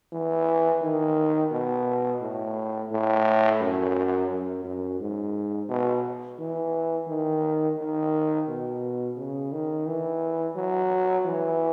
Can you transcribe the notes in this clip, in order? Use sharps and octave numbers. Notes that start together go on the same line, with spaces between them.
E3
D#3
B2
A2
A2
F#2
F#2
F#2
G#2
B2
E3
D#3
D#3
B2
C#3
D#3
E3
F#3
E3